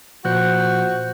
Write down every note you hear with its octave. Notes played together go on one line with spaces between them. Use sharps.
A#2 F3 F#4 C5 F#6 G6